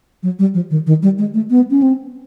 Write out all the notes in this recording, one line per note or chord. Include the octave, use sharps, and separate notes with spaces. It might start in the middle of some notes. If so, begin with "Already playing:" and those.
F#3
G3
F3
D#3
D#3
G3
G#3
A3
B3
C#4
C4